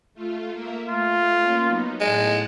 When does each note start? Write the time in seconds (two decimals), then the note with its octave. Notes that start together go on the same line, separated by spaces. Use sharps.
0.14 A3 F4
0.53 A#3 A#4 E5
0.89 A3 F4
1.37 A#3 C#4
1.66 F#3 B3 D#4
2.00 A2 G#3 F#5 A5